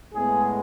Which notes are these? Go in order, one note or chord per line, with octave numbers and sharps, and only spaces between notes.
A2 G#3 B3 G#4